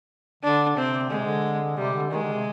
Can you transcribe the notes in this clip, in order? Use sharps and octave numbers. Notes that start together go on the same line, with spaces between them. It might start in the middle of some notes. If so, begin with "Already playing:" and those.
D3 D4
C3 C4
D3 G#3
C3
D3
C3 G3
D3
D#3 G#3
D3
C3